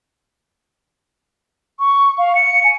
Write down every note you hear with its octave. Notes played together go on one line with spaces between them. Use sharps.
C#6
F5
C#7
G#5